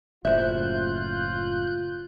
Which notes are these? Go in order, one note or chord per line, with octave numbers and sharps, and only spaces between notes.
F#1 A2 F4 C5 E5 F#6 G6